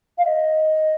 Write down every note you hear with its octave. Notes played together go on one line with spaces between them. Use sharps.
F5
D#5